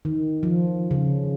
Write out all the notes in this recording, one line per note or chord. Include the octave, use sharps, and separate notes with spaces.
D#3
F3
C#3